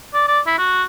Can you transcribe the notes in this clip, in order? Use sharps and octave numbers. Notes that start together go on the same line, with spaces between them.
D5
D5
E4
F#4